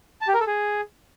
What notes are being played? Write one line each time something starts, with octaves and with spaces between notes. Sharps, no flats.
A5
G4
A#4
A4
G#4